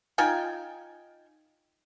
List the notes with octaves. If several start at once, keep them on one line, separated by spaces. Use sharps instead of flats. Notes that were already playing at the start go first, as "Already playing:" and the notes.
D#4 F4 G5 G#5